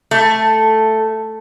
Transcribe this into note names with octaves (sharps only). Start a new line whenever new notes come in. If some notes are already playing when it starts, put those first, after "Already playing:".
A3